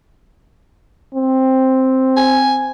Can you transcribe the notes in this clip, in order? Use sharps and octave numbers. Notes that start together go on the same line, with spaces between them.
C4
G#5